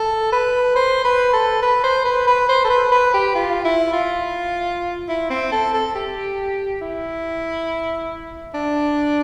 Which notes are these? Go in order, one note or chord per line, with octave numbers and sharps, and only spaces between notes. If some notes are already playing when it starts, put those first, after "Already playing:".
Already playing: A4
B4
C5
B4
A4
B4
C5
B4
B4
C5
A4
B4
B4
G4
F4
E4
F4
E4
C4
A4
A4
G4
E4
D4